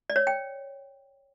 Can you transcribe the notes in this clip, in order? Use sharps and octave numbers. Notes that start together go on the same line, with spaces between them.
D5
C#5
G5